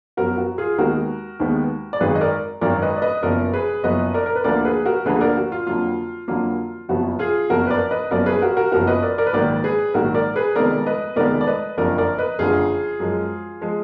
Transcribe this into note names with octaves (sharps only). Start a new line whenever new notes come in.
F#2 F3 B3 F#4 A#4
F#4
F4 G#4
D#2 D#3 G#3 B3 F#4 A#4
D#2 D#3 G#3 B3
D5
G#1 F#2 D#3 G#4 B4
D#5
A#4 D5
G#1 F#2 D#3 A#4 D5
B4 D#5
D5
B4 D#5
F#1 F#2 F3 B3 A#4 D5
G#4 B4
F#1 F#2 F3 B3 B4 D#5
A#4 D5
A#4
B4
D2 D3 F3 A#3 A#4 D5
G#4 B4
F#4 A#4
D2 D3 F3 A#3 G#4 B4
A#4 D5
F#4
F4
F2 D3 F#3 A#3 F4
F2 D3 F#3 A#3 F4
F#1 F2 F3 B3 F#4
F4 G#4
F#1 F2 F3 B3 F#4 A#4
B4
A#4 D5
B4 D#5
F#1 F#2 F3 B3 A#4 D5
G#4 B4
F#4 A#4
F#4 A#4
F#1 F#2 F3 B3 F#4 A#4
B4 D#5
A#4 D5
A#4 D5
B4
A#1 G#2 D#3 F#3 A#4 D5
G#4 B4
A#1 G#2 D#3 F#3 F#4 A#4
A#4 D5
G#4 B4
F1 F2 D#3 G#3 B3 A#4 D5
B4 D#5
F1 F2 D#3 G#3 B3 A#4 D5
D5
B4 D#5
F#1 F2 D3 F3 A#4 D5
A#4 D5
B4 D#5
F#1 F2 D3 F3 F4 G#4
F#2 F3 G#3
F3 G#3